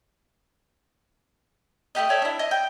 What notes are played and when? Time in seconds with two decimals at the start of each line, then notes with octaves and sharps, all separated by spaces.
1.95 A3 D#4 G4 D#5
2.10 A4 C#5 D5 E5
2.22 D4 E4
2.39 D#5
2.51 G5